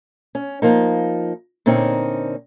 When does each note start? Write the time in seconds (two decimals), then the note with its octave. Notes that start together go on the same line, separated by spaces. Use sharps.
0.35 C#4
0.62 F3 A#3 D#4
1.66 A#2 D3 C4 C#4 D#4